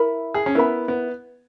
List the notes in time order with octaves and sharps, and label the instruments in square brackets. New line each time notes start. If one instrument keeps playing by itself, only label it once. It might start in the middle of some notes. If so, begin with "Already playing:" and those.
Already playing: [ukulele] E4 A#4 E5 B5
[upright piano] G#4
C#4
[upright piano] B3 [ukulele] E4 A#4 E5 B5
[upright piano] B3